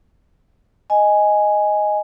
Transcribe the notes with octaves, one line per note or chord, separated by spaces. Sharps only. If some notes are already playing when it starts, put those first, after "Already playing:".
D#5 G#5